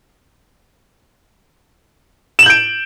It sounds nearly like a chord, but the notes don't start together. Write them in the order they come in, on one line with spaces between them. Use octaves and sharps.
E7 F#7 G6 D7